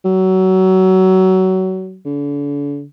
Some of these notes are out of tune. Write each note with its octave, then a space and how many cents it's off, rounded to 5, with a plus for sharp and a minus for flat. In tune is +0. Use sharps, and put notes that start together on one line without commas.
F#3 +25
D3 -40